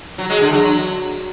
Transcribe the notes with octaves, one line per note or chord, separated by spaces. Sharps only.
F#3
G#3
D3
F#3